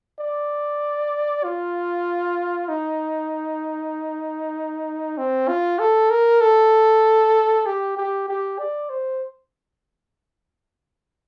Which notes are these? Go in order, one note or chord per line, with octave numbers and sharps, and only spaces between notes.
D5
F4
D#4
C4
F4
A4
A#4
A4
G4
G4
G4
D5
C5